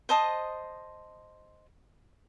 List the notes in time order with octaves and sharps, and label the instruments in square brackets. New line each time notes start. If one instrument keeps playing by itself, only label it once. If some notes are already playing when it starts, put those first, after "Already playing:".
[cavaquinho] C5 D#5 A5 D#6